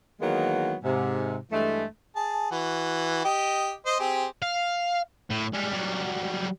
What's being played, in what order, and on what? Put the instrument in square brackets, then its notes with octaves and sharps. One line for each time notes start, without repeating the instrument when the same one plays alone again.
[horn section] D#3 E3 F#3 G#3 A#3 B3
G#2 C3
G2 E3 G#3 A3
[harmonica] G#4 A5
E3 F#4
G4 D#5
C5 D#5
C4 G4 G#4
[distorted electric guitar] F5
A2
G3 G#3
F#3 G3